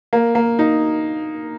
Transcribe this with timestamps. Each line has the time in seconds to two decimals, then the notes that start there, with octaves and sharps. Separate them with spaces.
0.13 A#3
0.35 A#3
0.59 D#4